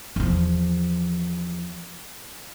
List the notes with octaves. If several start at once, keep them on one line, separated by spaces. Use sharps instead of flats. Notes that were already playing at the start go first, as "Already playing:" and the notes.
E2 F3